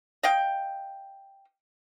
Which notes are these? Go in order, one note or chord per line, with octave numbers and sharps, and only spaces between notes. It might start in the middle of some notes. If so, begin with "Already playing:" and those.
D#5 F5 G5